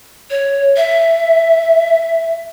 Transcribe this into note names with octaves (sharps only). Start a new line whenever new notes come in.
C#5
E5